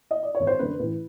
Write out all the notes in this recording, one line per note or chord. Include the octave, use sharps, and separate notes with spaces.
D#5
D5
G#1 C#5
C5
F#2 D3 B4
A1 B4